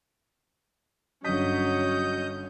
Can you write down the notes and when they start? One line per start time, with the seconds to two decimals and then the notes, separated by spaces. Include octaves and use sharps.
1.25 G1 F#3 C#4 D#5 D#6 G6 B6